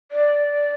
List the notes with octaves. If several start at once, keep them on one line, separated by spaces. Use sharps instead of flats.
D5